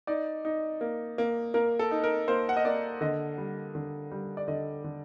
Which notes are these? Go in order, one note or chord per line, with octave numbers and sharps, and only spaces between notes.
D#4 D5
D#4
A#3
A#3
A#3 A#4
A4
D#4
A#4
A#3 C5
F#5
D#5
A#3 D5
D3 D#5
G3
D3
G3
D5
D3 D#5
D3